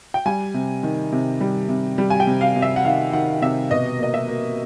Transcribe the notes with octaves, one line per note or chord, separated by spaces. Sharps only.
G5
G3 G#5
C3
D#3
C3
G3
C3
G3
G#5
G5
C3
F5
C3
E5
F#5
D#3 F5
D#3 F#5
C3 E5
B2 D#5
A#3 D#5
E5
A#3